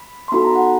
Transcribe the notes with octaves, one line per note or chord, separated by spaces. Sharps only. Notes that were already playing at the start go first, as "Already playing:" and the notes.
Already playing: B5
C6
B3 D#4 F#4 A4 B5
A#5
F#5